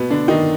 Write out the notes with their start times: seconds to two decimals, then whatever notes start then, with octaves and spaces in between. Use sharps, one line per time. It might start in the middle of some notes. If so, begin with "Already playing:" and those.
Already playing: B2 B3
0.10 D3 D4
0.28 D#3 D#4